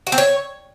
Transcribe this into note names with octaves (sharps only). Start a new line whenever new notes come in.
F#4
C4
C#5